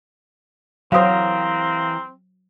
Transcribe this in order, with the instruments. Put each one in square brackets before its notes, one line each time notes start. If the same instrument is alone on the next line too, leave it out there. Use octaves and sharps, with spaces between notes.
[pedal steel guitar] E3 G4 A#4 [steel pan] F#3 C5 [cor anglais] C4 [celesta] F5 D#6